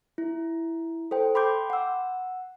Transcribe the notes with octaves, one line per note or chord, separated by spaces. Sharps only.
E4
A4 C5 G5
G5 B5 C6 D6 G6
F#5 E6